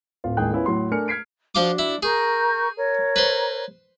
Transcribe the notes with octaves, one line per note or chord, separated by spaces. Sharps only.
D1 F4
A1 D#2 G#3 G#4 G5 F#6
B3 C#4 E4 F4 G#4
A2 F#3 C6
A3 D4 A#4 G#5 F6 C#7
F6 G#6 B6 C7 D7
F3 D4 F4 F#4 D6
E4
G#4 A#4 C#6 G6
A#4 C#5
B4 C5